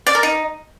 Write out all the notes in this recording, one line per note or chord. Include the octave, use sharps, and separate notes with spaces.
D5
A#4
D#4